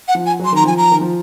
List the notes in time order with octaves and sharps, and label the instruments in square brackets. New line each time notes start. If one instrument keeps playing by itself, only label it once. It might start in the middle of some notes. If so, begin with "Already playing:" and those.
[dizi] F#5
[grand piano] F3
[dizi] G#5
[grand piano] F#3
[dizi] C6
[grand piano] D#3 [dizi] A#5
[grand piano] F3 [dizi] G#5
[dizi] A#5
[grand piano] D#3
F3